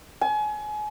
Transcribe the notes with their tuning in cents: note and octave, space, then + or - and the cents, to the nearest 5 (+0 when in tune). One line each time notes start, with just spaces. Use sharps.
G#5 +30